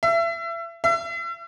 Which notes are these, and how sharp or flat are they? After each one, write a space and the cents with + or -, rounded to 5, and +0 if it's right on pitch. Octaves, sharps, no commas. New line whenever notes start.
E5 +30
E5 +40